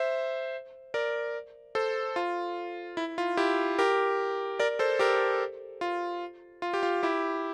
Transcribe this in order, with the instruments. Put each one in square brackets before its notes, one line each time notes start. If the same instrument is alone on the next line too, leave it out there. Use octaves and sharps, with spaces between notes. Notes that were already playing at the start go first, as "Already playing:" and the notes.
Already playing: [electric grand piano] C5 E5
A#4 D5
A4 C5
F4
E4
F4
E4 G4
G4 A#4
A#4 D5
A4 C5
G4 A#4
F4
F4
G4
F4
E4 G4